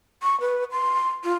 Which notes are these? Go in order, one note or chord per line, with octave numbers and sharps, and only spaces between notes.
C#6
B4
C6
F4